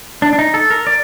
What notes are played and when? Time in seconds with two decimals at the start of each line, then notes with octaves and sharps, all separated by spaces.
0.22 D4
0.33 D4
0.39 D#4
0.54 A4
0.70 A#4
0.87 D5